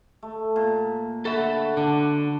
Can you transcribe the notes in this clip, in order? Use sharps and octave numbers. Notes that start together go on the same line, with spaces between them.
A3
A#2
D3 F#4 A4 E5 B5
D3 D4